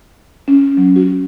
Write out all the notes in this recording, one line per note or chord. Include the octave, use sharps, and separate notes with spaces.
C#4
F#3
F#4